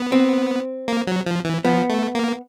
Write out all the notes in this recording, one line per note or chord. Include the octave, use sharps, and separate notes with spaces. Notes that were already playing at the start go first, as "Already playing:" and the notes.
Already playing: B3
C4
A#3
F#3
F3
E3
F3 B3
A3
A#3